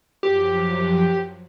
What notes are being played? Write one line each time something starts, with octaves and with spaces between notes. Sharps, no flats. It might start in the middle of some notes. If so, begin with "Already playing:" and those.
F#2 F3 F#3 G4